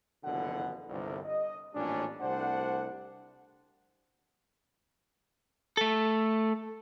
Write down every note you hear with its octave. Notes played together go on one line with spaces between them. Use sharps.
F#1 F2 B2 D3 E3 F#5
G1 C2
D#5
A1 F2 A#2 G3 C#4 D4
C2 A3 D4 C5 F#5
A3 A4